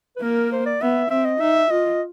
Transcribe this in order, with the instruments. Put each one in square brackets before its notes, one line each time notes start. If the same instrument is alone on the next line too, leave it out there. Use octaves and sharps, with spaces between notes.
[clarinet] B4
[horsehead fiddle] A#3 [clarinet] A#4
[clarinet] C5
D5
[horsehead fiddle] B3 [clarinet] E5
[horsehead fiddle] C4 [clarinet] E5
[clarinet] D#5
[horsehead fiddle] D#4 [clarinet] E5
[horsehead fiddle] F4 [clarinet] D#5